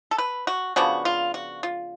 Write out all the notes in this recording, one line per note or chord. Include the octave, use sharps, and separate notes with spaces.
A4
B4
F#4
C#3 F3 B3 D4 F#4
F4
F#4
F4